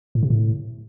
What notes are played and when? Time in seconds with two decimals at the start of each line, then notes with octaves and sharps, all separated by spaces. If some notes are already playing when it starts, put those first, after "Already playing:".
0.15 A2
0.23 C3
0.30 A2